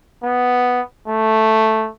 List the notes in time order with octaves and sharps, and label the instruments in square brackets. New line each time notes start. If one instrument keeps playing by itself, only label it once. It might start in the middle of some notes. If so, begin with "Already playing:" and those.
[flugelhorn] B3
A3